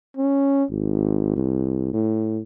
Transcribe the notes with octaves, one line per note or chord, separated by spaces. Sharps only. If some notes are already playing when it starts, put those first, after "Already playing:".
C#4
G#1
C2
A2